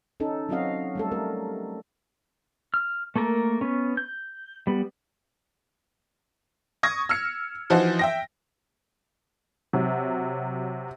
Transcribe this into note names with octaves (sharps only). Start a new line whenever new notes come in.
C#4 D#4 A4
F#3 C4 C#4 F#4 D#5 F5
G3 A3 A4
A3 A#4
F6
A3 A#3 A4 A#4
B3 C#4
G6
G3 B3
C#6 D#6 G#6 A#6
E6 F6 C#7
E3 F3 D#4 F#4 C5
E5 G5 A#6
C3 F#3